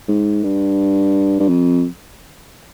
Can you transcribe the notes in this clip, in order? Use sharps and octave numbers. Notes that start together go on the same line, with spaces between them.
G#2
G2
G2
F2